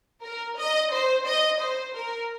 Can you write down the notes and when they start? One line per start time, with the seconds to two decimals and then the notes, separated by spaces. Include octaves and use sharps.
0.23 A#4
0.58 D#5
0.92 C5
1.26 D#5
1.60 C5
1.94 A#4